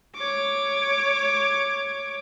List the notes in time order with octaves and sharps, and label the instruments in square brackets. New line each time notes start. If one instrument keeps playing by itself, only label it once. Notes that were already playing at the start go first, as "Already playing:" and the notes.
[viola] C#5 D6